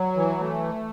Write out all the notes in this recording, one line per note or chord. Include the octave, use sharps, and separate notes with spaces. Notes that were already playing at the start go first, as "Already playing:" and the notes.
Already playing: F#3
E3
A3